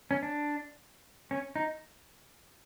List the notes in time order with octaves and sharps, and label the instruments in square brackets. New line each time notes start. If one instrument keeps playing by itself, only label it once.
[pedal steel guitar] C#4
D4
C#4
D#4